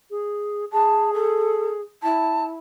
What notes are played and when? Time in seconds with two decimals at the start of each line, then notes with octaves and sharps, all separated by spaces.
0.11 G#4
0.73 G#4 A5
1.13 A4
2.03 E4 A5